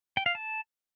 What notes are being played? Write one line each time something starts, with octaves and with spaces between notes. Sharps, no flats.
G5
F5
A5